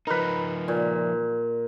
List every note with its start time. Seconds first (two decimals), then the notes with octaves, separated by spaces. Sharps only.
0.07 F3 D#4 A#4 B4
0.68 A#2